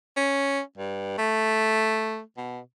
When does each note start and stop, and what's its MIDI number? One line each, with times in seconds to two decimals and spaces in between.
0.17 0.61 61
0.78 1.16 43
1.18 2.21 57
2.37 2.60 47